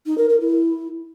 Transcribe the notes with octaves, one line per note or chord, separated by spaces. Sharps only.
D#4
A#4
A#4
E4